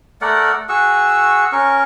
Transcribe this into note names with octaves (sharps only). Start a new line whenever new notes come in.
A3 A#4 D5 F#5
F#4 G#4 C#6 E6
C#4 A#4 C#6